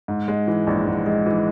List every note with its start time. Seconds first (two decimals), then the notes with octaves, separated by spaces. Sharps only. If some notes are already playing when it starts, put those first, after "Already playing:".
0.08 G#2
0.28 G#3
0.48 E3
0.67 A#1
0.87 G#2
1.06 G#3
1.26 E3